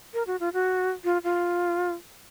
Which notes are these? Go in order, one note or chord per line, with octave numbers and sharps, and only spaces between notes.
A#4
F#4
F4
F#4
F4
F4